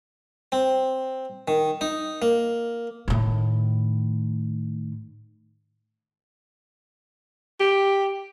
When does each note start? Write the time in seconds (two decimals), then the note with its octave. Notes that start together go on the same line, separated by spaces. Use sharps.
0.52 C4
1.48 D#3
1.81 D#4
2.22 A#3
3.08 A2 D#3
7.60 G4